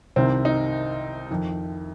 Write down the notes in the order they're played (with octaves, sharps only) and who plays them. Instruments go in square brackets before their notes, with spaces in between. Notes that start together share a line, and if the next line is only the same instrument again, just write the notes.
[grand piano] C2 C3 D#3 C4
D#4
F2 D#3